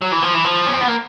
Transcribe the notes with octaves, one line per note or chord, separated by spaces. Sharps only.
F#3
E3
F3
E3
F3
C#4
C4
B3
A#3